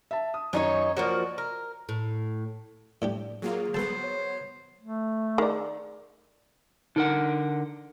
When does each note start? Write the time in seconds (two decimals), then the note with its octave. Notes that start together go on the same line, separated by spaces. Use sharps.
0.11 E5 A5
0.34 D#6
0.53 F#2 D#3 D4 D#4 C#5
0.97 F3 A#3 F#4 C#5 D5
1.38 A#4
1.89 A2
3.02 A2 D4 G4
3.42 F#3 A#3 F4 G#4
3.74 F#3 B3 A4 C5 A5
4.03 C#5
4.81 A3
5.38 D#3 G#4 D5
6.96 D3 D#4 A#4 F#5